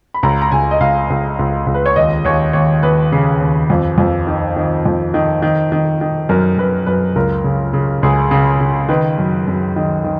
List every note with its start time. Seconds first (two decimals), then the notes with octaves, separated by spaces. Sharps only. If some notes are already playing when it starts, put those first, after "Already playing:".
0.14 B5
0.23 C#2 A#5
0.42 A#5
0.52 C#2 G#5
0.71 D#5
0.80 C#2 F5
1.10 C#2
1.39 C#2
1.67 C#2
1.74 B4
1.86 C#5
1.96 D#2 D#5
2.25 D#2 C#5
2.53 D#2 C#5
2.83 D#2 B4
3.12 C#3
3.41 D#2
3.70 F2
3.98 F2
4.27 D#3
4.56 D#3
4.86 F2
5.14 D#3
5.42 D#3
5.72 D#3
6.01 D#3
6.29 F#2 A#4
6.58 F#2 B4
6.86 F#2 B4
7.16 C#2 A#4
7.44 C#3
7.73 C#3
8.03 C#2 G#4
8.31 C#3
8.61 C#3
8.89 D#3 B4
9.18 F#2
9.48 F#2
9.76 D#3
10.04 D#3